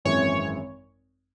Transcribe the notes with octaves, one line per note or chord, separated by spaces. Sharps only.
G#1 F#2 E3 G#3 C4 C#5